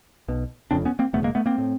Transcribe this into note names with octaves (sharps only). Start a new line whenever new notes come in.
B1 B2
F1 F2 C#3 C4 D4
B3 C#4
A#3 C4
E1 D2 C#3 A3 B3
G#3 A#3
A3 B3
A#3 C4
A2